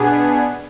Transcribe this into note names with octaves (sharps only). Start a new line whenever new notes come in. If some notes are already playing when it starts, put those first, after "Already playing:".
Already playing: B2 B3 D4 G#4